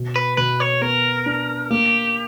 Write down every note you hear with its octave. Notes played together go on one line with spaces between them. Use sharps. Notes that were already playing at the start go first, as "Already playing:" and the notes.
Already playing: B2
B4
B2 B4
C#5
B3 A#4
D4
A#3 G4